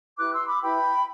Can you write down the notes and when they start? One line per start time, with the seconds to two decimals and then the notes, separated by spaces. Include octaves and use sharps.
0.18 E4 G4 B4 D6 F#6
0.33 C6 E6
0.47 B5 D6
0.62 E4 G4 B4 G5 B5